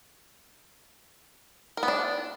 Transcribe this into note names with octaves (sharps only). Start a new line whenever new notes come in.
A#4
B3
D4